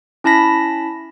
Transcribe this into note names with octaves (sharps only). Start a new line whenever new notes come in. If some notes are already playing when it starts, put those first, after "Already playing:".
C#4 E4 A5 B5 A#6 B6